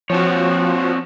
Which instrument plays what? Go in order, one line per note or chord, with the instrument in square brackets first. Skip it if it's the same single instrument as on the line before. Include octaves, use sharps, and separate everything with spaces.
[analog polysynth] F3 F#4 [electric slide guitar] C4 C#5